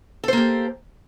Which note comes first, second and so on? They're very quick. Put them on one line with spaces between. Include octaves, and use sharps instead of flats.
A4 C5 A#3 G4